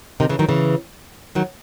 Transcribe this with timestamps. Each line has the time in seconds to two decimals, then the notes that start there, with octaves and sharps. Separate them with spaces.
0.20 C3 D#3
0.29 C#3 E3
0.39 D#3 F#3
0.49 C#3 E3
1.35 D#3 F#3